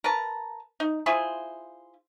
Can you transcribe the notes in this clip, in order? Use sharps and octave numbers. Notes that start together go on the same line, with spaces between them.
A#4 B4 A5 A#5
D#4
E4 F4 G#4 C5